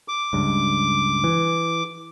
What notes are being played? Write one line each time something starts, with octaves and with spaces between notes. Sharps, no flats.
D6
C#2 G2
E3